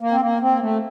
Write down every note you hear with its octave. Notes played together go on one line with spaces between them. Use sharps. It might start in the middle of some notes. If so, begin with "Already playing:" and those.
A#3
C4
A#3
C4
A#3
A3